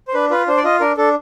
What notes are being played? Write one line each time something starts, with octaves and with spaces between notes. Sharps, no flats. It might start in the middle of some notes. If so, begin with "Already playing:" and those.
C5
D4 B4
F4 B4
D4 C5
D5
F4 D#5
D4 A#4
D4 A4